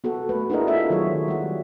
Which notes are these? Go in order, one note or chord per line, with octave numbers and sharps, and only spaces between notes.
B3 F#4 A4
A3 F#4 B4
D4 E4 F#4 G#4 A#4 D#5
B3 F4 A4 E5
D#3 F#3 G#4 C#5
G3 F#4